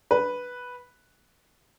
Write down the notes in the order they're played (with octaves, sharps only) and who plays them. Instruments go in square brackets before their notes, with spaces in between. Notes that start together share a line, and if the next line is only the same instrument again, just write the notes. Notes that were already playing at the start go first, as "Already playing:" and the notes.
[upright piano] B4